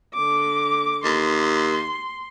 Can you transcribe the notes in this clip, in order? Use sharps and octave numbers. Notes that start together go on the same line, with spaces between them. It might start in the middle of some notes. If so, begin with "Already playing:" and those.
D3 D6
D#2 C6